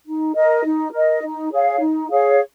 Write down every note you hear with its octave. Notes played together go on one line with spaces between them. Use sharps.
D#4
A#4 D#5
D#4
A#4 D#5
D#4
G#4 C#5 F5
D#4
G#4 C#5 F5